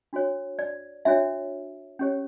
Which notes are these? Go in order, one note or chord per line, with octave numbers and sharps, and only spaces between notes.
D4 F#4 C#5
D5
D4 F#4 C#5 E5
C#4 G4 C#5